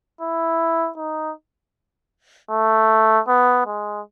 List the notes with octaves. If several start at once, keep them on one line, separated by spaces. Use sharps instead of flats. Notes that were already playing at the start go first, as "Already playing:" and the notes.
E4
D#4
A3
B3
G#3